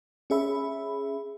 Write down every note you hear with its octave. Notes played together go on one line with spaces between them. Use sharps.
C#4 G#4 E5 B5